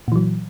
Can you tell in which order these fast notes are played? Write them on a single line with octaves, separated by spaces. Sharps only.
A#2 E3 F#3